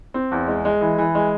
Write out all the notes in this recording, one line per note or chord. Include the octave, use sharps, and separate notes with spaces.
C4
E2
G#3
G#3
E3
E3
G#3